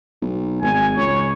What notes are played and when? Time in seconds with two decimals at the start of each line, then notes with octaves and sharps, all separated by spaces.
0.22 B1
0.62 G#1 G#5
0.97 C#2 C#5